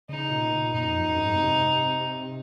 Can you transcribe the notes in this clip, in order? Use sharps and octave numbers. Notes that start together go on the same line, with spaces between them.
C#3 D#4
A#2
A#2
F#2 D#4
F2
F#2
G#2
C3